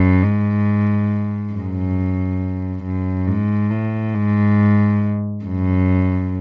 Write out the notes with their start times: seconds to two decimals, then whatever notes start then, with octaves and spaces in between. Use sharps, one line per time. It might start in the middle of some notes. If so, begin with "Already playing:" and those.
Already playing: F#2
0.23 G#2
1.53 F#2
2.85 F#2
3.27 G#2
3.71 A2
4.14 G#2
5.45 F#2